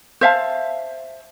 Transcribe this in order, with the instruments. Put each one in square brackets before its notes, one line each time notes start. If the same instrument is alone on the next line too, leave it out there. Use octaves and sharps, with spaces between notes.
[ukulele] C5 E5 F5 A5